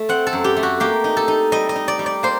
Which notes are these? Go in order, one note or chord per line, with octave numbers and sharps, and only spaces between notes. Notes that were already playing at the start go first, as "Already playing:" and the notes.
Already playing: A3
C4 F#5
A4
F#2
G4
A3
F#4
A#3 G4
D#4
A4
D#4
G3 D#5
D#5
D#4
D5
G3
D5
A#3 C5